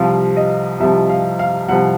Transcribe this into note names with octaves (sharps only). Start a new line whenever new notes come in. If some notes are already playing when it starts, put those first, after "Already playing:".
Already playing: C2 C3 F3 F5
D#5
C2 C3 F3 E5
F5
F5
C2 C3 F3 F#5